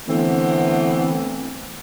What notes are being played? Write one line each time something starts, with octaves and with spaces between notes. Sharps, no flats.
D3 E3 A3 B3 C4